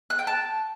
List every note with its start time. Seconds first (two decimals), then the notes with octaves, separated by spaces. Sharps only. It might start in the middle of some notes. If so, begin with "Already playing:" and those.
0.10 F#6
0.19 G5
0.27 A5